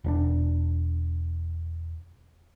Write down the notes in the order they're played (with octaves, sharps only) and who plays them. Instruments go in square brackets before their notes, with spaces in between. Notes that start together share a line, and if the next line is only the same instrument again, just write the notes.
[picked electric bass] E1 C#4 D4